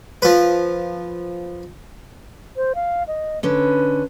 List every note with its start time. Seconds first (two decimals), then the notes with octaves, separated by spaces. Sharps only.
0.22 F3 B4
2.57 C5
2.75 F5
3.07 D#5
3.43 D3 C#4 B4